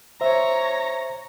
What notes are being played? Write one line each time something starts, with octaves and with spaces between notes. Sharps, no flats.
C5 C#5 E5 A#5